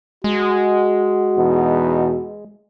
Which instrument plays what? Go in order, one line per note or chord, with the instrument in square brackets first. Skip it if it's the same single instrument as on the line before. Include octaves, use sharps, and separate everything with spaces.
[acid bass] G#3 [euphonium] F#4
[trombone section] E2 B2 D#4